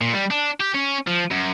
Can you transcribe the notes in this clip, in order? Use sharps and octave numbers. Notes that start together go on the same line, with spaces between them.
A#2
G3
D4
G4
C#4
F3
F#2